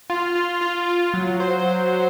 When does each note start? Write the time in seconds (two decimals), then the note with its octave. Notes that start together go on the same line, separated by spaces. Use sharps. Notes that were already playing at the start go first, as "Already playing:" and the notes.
0.10 F4
0.35 F4
0.61 F4
0.88 F4
1.14 F#3
1.40 C5
1.66 F#3
1.93 F#3